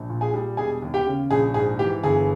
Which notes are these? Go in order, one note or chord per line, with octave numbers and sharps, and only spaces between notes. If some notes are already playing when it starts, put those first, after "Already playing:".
Already playing: A#1
A#2
G#4 G#5
G3
E1 G#4 G#5
D#2
G4 G5
C#3
A#1 G#4
G#2 G#4
E3 G4
G1 G#4